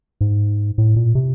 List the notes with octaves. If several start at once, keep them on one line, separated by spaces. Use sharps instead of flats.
G#2
A2
A#2
C3